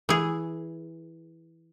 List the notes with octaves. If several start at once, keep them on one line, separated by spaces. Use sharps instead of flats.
E3 G#4